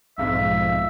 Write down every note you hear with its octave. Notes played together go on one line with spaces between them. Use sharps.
B1 F2 G#2 E5 F5